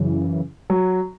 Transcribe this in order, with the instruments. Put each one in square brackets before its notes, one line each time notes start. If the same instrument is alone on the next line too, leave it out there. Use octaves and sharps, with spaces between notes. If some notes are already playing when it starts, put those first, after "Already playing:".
Already playing: [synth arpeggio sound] F#2 C#3 E3
[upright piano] F#3